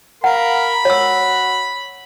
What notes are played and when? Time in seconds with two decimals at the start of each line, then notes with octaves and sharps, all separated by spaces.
0.24 A#4 F5 F#5 B5
0.85 F#4 C#5 E6